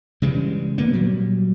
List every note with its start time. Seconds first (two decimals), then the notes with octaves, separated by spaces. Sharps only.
0.22 C#3 E3 G3 G#3
0.78 D3 A#3 B3
0.93 A#2 F#3 G3